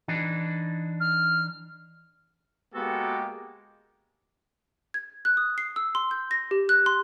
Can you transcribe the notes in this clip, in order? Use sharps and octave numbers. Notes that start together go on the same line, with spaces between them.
E3 D4 D#4
F6
G#3 A#3 B3 F#4 G4 A4
G#6
F#6
D#6
C7
E6
C6
G6
A#6
G4
F#6
C6